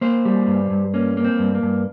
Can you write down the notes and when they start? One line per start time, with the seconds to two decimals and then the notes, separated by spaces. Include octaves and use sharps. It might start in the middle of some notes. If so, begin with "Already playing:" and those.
0.01 A#3 C5
0.25 G3
0.47 G2
0.70 G2
0.94 A#3 C#4
1.17 A#3
1.24 C4
1.39 G2
1.55 A#3
1.63 G2